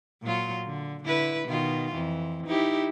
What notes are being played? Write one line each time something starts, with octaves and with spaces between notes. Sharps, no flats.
A#2 F#3 F4
D3
D3 E4 B4
B2 D#3 F4
F2 E3
D#4 E4 G4